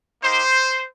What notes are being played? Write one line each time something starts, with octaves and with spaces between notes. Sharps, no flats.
A#3 D#4 G4 C5